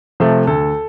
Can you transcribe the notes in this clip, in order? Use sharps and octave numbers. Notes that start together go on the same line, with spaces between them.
C3 F3 A3
D2 A4